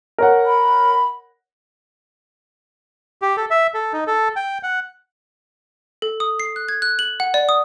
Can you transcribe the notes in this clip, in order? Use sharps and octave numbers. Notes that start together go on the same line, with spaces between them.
A#4 C#5 F#5
B5
G4
A4
E5
A4
D#4
A4
G5
F#5
A4
D#6
C7
F#6
G#6
F#6
F#7
F#5
D5
D#6